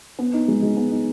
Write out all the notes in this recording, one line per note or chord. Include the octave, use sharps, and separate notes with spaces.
B3
D#4
G#3
G#3
B3
D#4